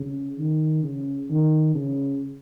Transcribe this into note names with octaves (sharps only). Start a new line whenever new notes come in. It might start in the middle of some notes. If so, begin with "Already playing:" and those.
Already playing: C#3
D#3
C#3
D#3
C#3